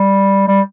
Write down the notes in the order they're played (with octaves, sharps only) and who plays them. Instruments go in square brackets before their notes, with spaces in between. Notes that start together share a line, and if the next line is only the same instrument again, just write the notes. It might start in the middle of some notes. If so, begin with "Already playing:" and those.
Already playing: [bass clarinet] G3
G3